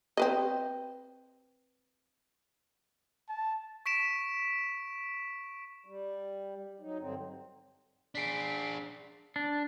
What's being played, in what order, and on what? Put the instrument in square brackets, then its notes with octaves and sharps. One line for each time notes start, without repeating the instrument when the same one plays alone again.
[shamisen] C4 B4 D#5
[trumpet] A5
[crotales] C#6 B6 D7 E7
[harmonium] G3
F#3 D#4
G2 D3 F#3 C4
[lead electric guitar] D4 G#4 [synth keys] B6 C7 D7
[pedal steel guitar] D4